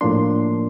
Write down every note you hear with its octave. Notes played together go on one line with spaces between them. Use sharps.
A2 F3 A#3 D4 C6